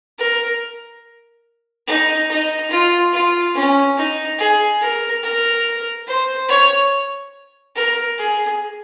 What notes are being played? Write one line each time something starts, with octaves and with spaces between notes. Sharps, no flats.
A#4
D#4
D#4
F4
F4
C#4
D#4
G#4
A#4
A#4
C5
C#5
A#4
G#4